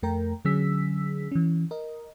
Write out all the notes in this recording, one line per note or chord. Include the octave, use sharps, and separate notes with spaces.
F2 A3 A#4 G5 A#5
D3 F#3 C#4 G#4 E6 B6
E3 C#4
A#4 D#5